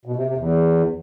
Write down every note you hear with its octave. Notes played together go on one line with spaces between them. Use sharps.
B2
C3
C3
E2